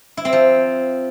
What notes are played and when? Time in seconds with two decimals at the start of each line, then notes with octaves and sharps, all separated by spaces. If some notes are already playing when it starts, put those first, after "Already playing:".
0.17 E4
0.25 C4
0.33 F3